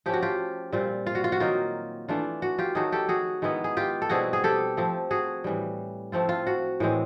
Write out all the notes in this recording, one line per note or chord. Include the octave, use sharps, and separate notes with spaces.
F3 A3 C#4 G4
F#4
F4 G4
A#2 G3 C4 F4
F4
F#4
F4
F#4
D#3 F#3 A#3 D#4 F4
E3 A3 D4 F4
F#4
F4 G4
D#3 F#3 A3 F#4 G#4
G4 A4
F#4 G#4
D#3 G#3 B3 E4
G#4
F4 G4
A4
B2 G3 C4 E4 F#4 G#4
G#4
G4 A4
F3 A3 C4
F#4 G#4
A2 E3 G3
F3 A3 C4 F4
F4
F#4
A2 E3 G#3 C4